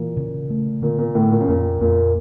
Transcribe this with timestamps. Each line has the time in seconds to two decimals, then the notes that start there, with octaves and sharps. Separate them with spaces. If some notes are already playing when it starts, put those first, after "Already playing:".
Already playing: A#2 E3
0.17 C#3
0.50 A3
0.82 A#2 D3
0.99 A#2
1.15 A2 D3
1.31 A#2
1.41 C#3
1.48 F2 A#2
1.81 F2 A#2